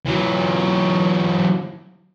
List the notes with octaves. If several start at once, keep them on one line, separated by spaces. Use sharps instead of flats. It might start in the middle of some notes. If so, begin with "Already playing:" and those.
E3 F#3